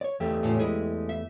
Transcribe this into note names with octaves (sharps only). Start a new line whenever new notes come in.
C#5 D5
E2 A3 G4
A2 C#3 F4
G#3 E4 G#4
E5